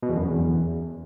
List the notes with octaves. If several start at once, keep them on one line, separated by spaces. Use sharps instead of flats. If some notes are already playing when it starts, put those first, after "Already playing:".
B2
E2
F#2
F2
E2